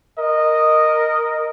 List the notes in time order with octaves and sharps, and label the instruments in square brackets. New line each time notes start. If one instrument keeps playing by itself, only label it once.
[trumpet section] A#4 D#5